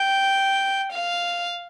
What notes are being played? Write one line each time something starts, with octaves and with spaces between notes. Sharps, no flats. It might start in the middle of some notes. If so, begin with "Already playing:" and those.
Already playing: G5
F5